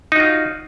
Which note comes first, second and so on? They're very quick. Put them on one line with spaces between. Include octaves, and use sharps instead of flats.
D#4 F#4 F4